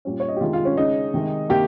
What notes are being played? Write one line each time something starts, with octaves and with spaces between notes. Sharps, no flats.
A#2 G3 C#4
C#5
D#5
G4
C3 D#3 G#3 F4
F4
C#4
C#3 G#3 C#4 D#4
C3 D#3 G#3
C3 D#3 A#3 G4